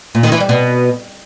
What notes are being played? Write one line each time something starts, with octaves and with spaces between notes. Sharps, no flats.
A#2
D#3
E3
G3
B2